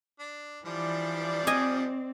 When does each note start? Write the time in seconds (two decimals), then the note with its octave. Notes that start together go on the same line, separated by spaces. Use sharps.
0.19 D4
0.65 E3 F3 G3 D4 D5
1.47 C4 D#5 G#5